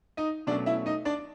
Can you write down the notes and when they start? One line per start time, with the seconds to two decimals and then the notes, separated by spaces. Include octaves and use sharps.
0.17 D#4 D#5
0.47 B2 F#3 A3 C#4 D4 D5
0.66 E4 E5
0.86 D#4 D#5
1.05 D4 D5